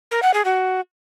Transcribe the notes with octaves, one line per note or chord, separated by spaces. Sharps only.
A#4
F#5
G#4
F#4